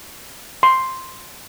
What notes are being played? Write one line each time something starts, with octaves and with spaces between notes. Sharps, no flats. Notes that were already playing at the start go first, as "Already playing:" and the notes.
C6